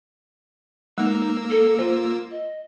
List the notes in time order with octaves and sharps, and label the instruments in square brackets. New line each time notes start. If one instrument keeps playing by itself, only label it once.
[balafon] G#3 [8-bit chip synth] A#3 E6 [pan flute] D#4
[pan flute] A4
[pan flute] F4 [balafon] C5
[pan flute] D#5